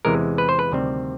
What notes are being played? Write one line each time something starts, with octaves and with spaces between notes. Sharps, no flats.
E2 C3 E3 G#3 A#4
B4
C5
B4
D2 C3 D#3 G3 C4